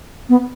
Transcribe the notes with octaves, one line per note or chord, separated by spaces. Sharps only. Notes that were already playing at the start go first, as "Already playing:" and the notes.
B3